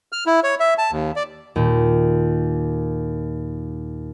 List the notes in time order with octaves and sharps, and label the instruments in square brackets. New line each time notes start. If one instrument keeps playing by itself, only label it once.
[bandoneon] F6
E4
C#5
E5
A5
D#2
D5
[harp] D#2 A#2